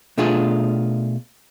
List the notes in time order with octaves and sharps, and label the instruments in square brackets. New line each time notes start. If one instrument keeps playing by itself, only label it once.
[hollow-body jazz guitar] B2 A3 D4 F4 G#4